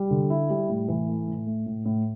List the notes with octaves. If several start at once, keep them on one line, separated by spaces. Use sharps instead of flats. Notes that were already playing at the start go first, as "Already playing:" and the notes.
Already playing: G3
D3
E4
G3
A2
E3
A3
A2
A3
A2
A2